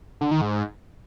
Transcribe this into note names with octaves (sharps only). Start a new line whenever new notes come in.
D3
D#3
G#2